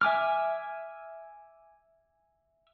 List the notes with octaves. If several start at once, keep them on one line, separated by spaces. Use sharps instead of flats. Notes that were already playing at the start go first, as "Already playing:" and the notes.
E5 G#5 D6 F6